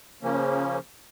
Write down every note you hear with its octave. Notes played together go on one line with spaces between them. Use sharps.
C#3 F3 A#3 C#4